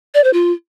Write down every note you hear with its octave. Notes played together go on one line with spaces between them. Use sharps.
D5
C5
F4